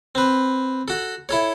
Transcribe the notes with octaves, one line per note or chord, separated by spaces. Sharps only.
C4 B4
F#4 A4
E4 A4 C#5